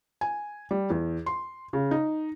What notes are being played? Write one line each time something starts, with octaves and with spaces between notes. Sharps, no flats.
G#5
G3
E2
C6
C#3
D#4